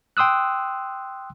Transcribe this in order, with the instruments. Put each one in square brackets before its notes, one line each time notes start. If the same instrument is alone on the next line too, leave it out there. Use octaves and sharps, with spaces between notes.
[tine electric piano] G5 C6 D#6 E6 F#6